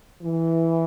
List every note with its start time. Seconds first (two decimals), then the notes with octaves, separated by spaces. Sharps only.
0.23 E3